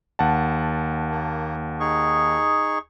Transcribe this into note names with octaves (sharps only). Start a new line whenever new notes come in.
D#2 F#5 A5
A#3
D#4 G#4 C#6